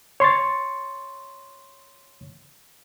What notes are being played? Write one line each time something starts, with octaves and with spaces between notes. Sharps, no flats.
C#5 C6 C#6 A6